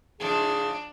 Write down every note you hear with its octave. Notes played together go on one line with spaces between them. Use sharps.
G#2 C#3 F3 D4 G#4